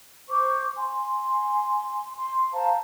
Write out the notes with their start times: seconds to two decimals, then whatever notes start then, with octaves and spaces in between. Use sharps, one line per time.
0.30 C5 C#6 D6
0.75 G#5 C6
2.17 C6
2.53 C5 F5 A5 A#5